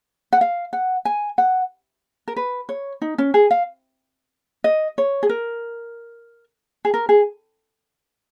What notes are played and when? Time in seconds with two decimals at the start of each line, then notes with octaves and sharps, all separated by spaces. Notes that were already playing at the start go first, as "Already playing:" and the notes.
0.33 F#5
0.41 F5
0.73 F#5
1.05 G#5
1.38 F#5
2.28 A#4
2.37 B4
2.69 C#5
3.02 D#4
3.18 C#4
3.34 G#4
3.51 F5
4.64 D#5
4.98 C#5
5.23 G#4
5.29 A#4
6.85 G#4
6.94 A#4
7.09 G#4